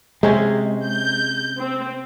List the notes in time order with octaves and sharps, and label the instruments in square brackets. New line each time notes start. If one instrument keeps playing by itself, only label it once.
[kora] C3 C#4 C5 [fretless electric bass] G#3
[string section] G6
C4